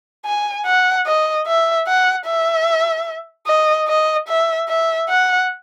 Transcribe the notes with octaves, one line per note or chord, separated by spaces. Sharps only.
G#5
F#5
D#5
E5
F#5
E5
D#5
D#5
E5
E5
F#5